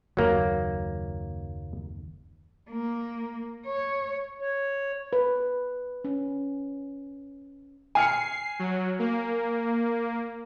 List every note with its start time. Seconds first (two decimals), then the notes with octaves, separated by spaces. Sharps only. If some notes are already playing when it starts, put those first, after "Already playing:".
0.17 F#1 D#2 F#3 A#3
2.70 A#3
3.67 C#5
4.40 C#5
5.13 B4
6.04 C#4
7.95 G#5 F6 C7 C#7
8.59 F#3
8.99 A#3